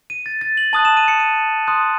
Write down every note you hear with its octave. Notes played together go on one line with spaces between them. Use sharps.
D#7
A6
A6
F#7
A5 D#6 F#6 F#7
E7
D#7
C#7
D#7
C6 D#6 F#6